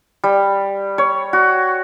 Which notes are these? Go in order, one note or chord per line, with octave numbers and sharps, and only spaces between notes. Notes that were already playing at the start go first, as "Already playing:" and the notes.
G3
C#5
F#4